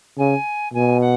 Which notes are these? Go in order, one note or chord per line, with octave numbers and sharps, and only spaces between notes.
C#3 G#5
B2 G#5
F#5